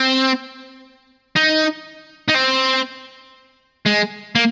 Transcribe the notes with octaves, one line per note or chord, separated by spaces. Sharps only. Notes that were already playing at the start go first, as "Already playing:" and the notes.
Already playing: C4
D#4
D#4
C4
G#3
A#3